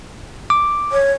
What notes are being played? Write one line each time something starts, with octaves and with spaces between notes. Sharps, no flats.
D6
C#5